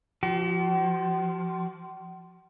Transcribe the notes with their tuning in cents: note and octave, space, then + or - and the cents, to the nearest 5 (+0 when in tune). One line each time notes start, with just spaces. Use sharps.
F3 +0 F#4 +45